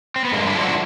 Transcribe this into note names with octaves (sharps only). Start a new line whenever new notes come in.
C4
B3
G2 G#3 A#3
D4 E4
D3 F3
E4 F#4